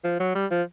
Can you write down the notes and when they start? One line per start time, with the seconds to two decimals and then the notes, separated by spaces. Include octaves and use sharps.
0.04 F3
0.20 F#3
0.35 G3
0.51 F3